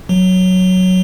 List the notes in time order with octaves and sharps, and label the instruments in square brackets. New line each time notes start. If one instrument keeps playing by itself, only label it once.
[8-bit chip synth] F#3